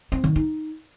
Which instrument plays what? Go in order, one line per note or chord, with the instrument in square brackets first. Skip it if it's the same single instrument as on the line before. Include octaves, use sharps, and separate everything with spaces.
[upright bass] C4
D#3
D#4